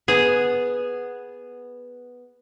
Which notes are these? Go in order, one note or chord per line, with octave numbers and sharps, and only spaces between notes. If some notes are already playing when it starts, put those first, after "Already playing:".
B3 G#4